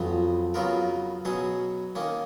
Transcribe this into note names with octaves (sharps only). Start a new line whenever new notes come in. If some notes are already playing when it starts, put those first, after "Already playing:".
Already playing: F2 C#3 F3 F#3 B3
C#3 F#3 B3 F4 A#4
B2 F#3 C#4 G#4
D#3 A#3 C#4